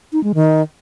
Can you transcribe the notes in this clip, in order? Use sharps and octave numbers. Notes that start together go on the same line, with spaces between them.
D#4
G#3
D#3